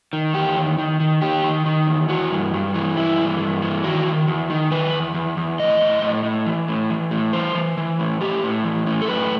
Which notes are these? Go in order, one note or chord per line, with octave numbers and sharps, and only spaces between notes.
D#3
E2 G4
D#3
D#3
D#3
D#3 G4
D#3
D#3
E2
E3 F#4
G2
G2
E3
G2 E4
E3
G2
E3
D#3 F#4
D#3
E2
D#3
D#3 B4
E2
E2
E2
A2 D#5
A2
A2
A2
E3
A2
E3
A2
E3 C5
E3
E3
A2
A2 G4
A2
E3
A2
A4
F#2 B4